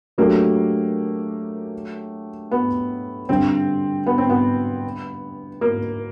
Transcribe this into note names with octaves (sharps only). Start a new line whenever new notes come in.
F#3 A3 A#3 D4 G4
B3
G2 D3 G3 C4
B3
C4
B3
A#3